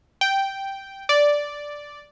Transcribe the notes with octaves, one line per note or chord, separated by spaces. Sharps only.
G5
D5